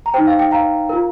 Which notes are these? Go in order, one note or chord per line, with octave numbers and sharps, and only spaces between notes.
A#5
D#4 C5 G5
F5
G5
F5 A#5
F4 A#4